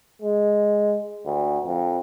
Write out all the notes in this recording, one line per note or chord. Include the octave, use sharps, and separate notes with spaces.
G#3
D2
F2